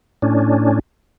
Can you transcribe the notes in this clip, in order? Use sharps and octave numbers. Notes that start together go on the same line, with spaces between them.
A2 C#4 D4